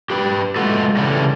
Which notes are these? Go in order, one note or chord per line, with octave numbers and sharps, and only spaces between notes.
G4 B4
G#3 A3 B3 F4 F#4 A4
C#3 E3 G3 A3 A4